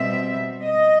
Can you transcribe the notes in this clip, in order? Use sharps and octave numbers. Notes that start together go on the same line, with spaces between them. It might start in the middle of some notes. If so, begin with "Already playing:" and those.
Already playing: B2 G3 C4 E5
D#5